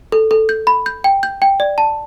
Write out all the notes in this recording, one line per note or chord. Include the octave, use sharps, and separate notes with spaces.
A4
A4
G6
B5
G6
G5
G6
G5
D5
A5